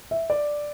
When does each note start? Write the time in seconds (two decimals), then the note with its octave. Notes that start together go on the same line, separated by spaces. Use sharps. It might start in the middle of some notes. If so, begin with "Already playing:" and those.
0.11 E5
0.30 D5